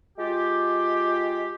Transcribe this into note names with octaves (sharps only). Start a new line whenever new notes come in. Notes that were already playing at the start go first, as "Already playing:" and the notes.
G#3 F4 G4